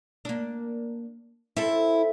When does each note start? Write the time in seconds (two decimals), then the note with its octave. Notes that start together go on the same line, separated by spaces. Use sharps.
0.25 A#3 D4
1.57 C4 E4 A4